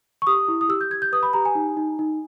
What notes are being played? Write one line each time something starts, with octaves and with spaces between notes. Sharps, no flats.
C#6
G4 D#6
E4
D#6
G4 E6
G6
G4 G#6
G6
B4 D#6
B5
G4 A#5
G#5
D#4
D#4
D#4